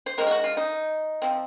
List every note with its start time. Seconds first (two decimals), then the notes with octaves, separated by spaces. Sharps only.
0.06 C5
0.18 D#3 G#3 C#4 A#4
0.27 F4
0.31 F#4
0.44 F4
0.57 D#4
1.22 F3 C4